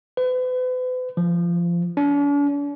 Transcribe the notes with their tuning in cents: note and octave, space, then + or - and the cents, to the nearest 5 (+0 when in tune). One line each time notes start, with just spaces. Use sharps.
B4 +40
F3 -20
D4 -45